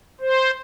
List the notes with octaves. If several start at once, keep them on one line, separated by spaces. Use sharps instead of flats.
C5